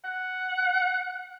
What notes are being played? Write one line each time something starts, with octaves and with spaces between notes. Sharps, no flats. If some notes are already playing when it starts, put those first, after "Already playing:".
F#5